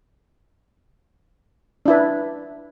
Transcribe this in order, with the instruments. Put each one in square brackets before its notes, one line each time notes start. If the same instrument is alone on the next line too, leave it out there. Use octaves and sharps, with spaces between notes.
[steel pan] D4 E4 B4